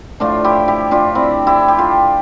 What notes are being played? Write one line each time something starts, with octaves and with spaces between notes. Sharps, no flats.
A2 F3 A3 D4 F4
E4 G4
E4 G4
D4 F4
C4 E4
E4 G4
G4
F4 A4